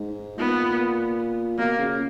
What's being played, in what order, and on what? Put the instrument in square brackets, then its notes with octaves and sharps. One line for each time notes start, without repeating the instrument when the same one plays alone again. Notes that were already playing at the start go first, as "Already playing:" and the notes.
Already playing: [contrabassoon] G#2
[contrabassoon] A#2 [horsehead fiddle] B3
[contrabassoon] B2 [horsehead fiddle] A#3
[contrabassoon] C#3